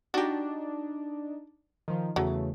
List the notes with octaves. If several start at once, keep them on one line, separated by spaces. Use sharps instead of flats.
D4 D#4 F#4 G4
D#3 F3
E2 C#3 F#3 A3